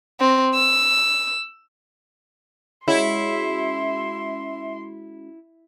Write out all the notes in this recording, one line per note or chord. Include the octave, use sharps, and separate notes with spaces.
C4
E6
G#3 C#4 E4 F#4 E5 C6